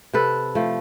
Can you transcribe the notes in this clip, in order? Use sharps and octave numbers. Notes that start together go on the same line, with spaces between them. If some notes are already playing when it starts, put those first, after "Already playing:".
C3 A4 B4
F3 A3